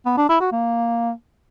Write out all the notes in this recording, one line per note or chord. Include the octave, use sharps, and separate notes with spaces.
B3
D4
E4
F#4
A#3